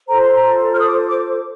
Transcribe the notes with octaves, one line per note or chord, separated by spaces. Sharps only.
F4 A4 C5 A#5
C6
A#5
F6
D#6
D6
D6